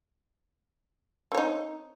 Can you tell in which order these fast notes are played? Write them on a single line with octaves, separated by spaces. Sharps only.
C4 C#5 D#4